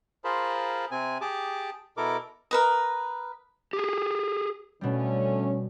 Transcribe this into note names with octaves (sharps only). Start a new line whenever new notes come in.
F4 G#4 A#4 C5 A5 B5
C3 C4 G#5
G4 G#4 A5 D6
B2 E4 A4 A#4 D6
A#4 B4 D#5
G4 G#4
B2 D3 G3 A3 C#4